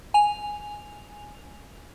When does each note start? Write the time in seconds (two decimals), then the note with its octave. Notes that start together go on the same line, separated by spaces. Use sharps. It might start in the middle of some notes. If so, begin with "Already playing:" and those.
0.14 G#5 F7